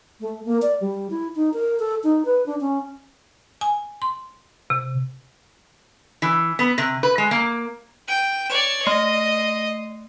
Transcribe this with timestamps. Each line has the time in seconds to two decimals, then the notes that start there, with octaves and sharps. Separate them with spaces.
0.21 A3
0.45 A#3
0.62 D5
0.81 G3
1.10 E4
1.36 D#4
1.54 A#4
1.80 A4
2.04 D#4
2.25 B4
2.46 D4
2.61 C#4
3.61 G#5
4.02 C6
4.70 C3
6.22 E3
6.59 B3
6.78 C3
7.03 B4
7.18 G#3
7.31 A#3
8.08 G5 D#7
8.50 C#5 D5 E7
8.86 A3 D#5 C7